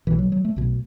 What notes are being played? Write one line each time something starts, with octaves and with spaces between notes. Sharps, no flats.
B1 B2 E3
F#3
F#3
A3
B1 B2